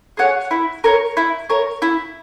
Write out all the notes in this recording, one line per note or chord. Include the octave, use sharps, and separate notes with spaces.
G#4 C#5 F#5
E4
A#4 C#5
E4
A#4 C#5
E4